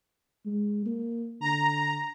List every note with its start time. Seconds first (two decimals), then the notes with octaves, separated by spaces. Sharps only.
0.46 G#3
0.86 A#3
1.41 D3 A#5